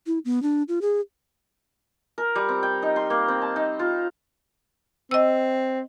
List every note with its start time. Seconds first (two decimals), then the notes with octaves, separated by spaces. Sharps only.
0.07 E4
0.25 B3
0.43 D4
0.68 F4
0.82 G#4
2.18 A#4
2.35 G3
2.49 C4
2.63 G5
2.82 D#4
2.96 C6
3.10 A#3
3.28 C4
3.42 A5
3.56 D#4
3.79 F4
5.11 C4 D#5 E6